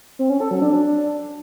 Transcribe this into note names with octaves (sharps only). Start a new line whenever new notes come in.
C4
C#4
A4
F#3
D4